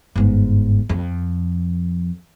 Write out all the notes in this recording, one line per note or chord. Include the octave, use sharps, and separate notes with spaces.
G1 G#2
F2